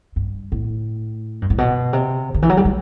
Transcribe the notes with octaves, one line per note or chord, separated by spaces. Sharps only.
G2
A2
G2
A2
B2
C3
D3
E3
F#3
G3
A3